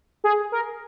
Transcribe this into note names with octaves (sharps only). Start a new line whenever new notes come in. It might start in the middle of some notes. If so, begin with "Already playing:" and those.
G#4
A#4